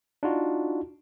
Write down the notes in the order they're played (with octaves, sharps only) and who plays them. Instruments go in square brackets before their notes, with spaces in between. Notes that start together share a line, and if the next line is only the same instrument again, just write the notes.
[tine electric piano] D4 D#4 F4 F#4